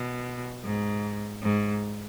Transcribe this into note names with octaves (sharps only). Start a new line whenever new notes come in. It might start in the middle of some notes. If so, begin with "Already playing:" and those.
Already playing: B2
G#2
G#2